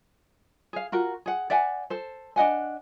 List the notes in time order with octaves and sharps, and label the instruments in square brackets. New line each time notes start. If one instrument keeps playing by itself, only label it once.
[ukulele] G#4 F5
F4 F#4 A#4
G#4 F#5
D5 E5 F#5 G#5
A4 C5
D4 D#5 F#5 G#5